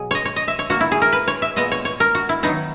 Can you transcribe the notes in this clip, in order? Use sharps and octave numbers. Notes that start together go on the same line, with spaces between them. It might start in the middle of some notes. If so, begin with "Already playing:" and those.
Already playing: B2 F#3 G#4
C#5 D#5
C#5
D#5
E5
C#5
A#2 A#3 F#4
E4
G#4
A#4
B4
C#5
E5
A#2 G#3 B3 D#5
C#5
C#5
A#4
F#4
E4
D#3 F#3 B3 D#4